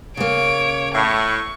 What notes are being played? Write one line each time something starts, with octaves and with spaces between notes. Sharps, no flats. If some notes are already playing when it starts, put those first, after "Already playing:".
C#3 A#3 C#5 D7
A2 C#6